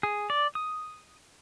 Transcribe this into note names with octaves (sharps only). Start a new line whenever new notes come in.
G#4
D5
D#6